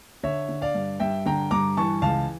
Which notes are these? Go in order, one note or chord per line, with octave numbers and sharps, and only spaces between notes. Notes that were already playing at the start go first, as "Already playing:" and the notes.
D3 C#5 E5
D3
D5 F5
G2
G2 E5 G5
D3 G5 A#5
G2 A#5 D6
E3 A5 C#6
C#2 F5 A5